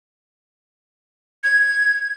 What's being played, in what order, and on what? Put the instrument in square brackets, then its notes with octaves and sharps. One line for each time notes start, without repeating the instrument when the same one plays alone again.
[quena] G#6